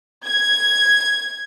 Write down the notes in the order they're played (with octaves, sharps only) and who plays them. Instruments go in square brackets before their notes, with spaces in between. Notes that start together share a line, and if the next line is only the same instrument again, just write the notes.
[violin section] G#6